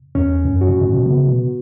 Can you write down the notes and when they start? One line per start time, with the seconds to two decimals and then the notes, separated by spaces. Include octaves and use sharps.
0.15 E2 C#4
0.45 F#2
0.61 F#4
0.69 G2
0.81 A2
0.94 B2
1.06 C#3 B3
1.28 B2